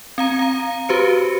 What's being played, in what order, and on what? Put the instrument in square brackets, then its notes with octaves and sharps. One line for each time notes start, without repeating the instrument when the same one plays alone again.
[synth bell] C4 F5 A#5
F5 A#5
F#4 G4 B4 C5 C#7